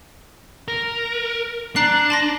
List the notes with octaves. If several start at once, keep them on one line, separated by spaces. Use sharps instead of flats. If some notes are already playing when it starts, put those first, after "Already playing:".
A#4
D4 A#5 F#6 C7
A5 C6 A#6